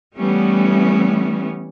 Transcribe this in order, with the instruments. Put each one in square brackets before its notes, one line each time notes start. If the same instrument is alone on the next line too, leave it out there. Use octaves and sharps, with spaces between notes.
[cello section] E3 G3 A3 B3 C#4